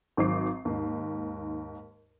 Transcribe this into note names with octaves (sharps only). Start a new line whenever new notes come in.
G#1 D#3 F#3 C4 D6 C7
D#2 G#2